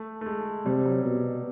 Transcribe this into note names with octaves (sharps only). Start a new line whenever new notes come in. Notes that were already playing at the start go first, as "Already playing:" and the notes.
Already playing: A3
A3
G#3
C3 G3
F#3
B2